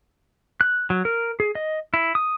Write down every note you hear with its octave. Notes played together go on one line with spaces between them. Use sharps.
F#6
F#3
A#4
G#4
D#5
E4
D#6